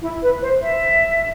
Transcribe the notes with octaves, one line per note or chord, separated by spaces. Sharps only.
E4
B4
C5
E5